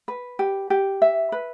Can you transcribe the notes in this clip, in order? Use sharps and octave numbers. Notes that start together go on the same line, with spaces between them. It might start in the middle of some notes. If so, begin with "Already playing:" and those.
B4
G4
G4
E5
B4